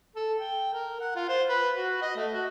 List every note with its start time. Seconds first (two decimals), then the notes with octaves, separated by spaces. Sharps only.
0.16 A4
0.39 G5
0.73 A#4
1.00 F#5
1.16 F4
1.29 C5
1.49 B4
1.75 F#4
2.02 D#5
2.16 A3
2.33 F#4